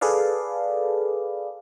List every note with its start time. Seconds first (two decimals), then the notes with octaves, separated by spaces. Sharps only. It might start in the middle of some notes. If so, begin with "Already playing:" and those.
0.01 G#4 A4 B4 D5 F5